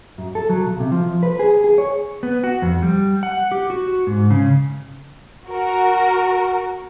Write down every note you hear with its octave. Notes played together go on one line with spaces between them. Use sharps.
F#2
A4
F#3
B1
C3
F3
B4
G#4
G#4
C#5
B3
F#4
F2
G3
F#5
G4
F#4
G#2
C#3
F#4 A#4